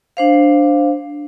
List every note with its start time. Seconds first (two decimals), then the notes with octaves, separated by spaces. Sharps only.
0.17 D4 C5 F5